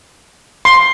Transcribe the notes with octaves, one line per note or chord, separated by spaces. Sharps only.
C6